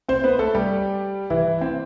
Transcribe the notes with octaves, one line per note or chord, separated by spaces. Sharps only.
C4 C5
B3 B4
A3 A4
G3 G4
E3 E4
C4